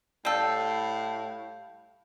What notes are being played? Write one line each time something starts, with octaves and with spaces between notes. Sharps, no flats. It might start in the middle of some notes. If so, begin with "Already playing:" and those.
A2 G3 A4 F5 G6 C7